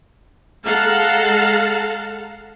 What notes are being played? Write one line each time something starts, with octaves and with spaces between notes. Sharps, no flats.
G#3 A4 F5 F#5 A5 A#5